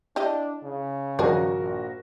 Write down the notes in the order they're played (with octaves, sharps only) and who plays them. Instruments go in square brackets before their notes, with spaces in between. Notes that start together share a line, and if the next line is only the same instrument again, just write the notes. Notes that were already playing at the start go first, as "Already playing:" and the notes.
[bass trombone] D4 [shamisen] E4 G4 D#5
[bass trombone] C#3
[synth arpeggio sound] G2 D#3 F3 [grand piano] F#4 A#4 [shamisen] G#4 D5
[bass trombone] A#1